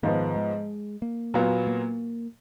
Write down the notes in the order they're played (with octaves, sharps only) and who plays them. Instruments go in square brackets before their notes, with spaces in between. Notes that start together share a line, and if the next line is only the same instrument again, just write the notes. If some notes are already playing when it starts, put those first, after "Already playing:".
[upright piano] G#2 F3 B3 [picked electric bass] D#3
[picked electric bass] G#3
A#3
[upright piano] A#2 F#3 B3 F4
[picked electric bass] A#3